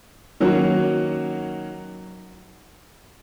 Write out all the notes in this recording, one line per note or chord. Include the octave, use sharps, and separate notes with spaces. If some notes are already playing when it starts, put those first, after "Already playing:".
D#3 F#3 A#3 C#4 F#4